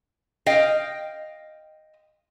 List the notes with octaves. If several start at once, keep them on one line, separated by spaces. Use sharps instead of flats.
D#5 F5 G5